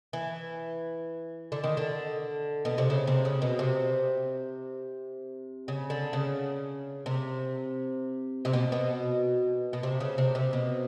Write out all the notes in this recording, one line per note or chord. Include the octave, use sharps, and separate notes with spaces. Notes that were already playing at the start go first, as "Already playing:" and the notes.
E3
D3
D#3
D3
B2
C3
C#3
C3
C#3
B2
C3
C#3
D3
C#3
C3
C3
B2
B2
B2
C3
C#3
C3
C3
B2